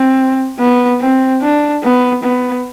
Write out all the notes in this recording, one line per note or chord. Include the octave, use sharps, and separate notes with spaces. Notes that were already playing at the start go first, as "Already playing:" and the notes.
Already playing: C4
B3
C4
D4
B3
B3